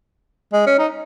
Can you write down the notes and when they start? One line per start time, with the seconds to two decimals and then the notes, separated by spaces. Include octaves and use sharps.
0.54 G#3
0.67 C#4
0.79 D#4